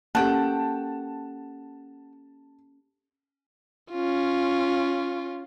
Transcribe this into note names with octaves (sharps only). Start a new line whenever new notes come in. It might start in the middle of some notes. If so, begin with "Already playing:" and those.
A#3 C#4 G4 A4 F#5 G5 A5
C#4 F4